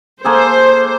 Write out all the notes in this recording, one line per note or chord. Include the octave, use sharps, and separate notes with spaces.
A#3 G#4 A4 C5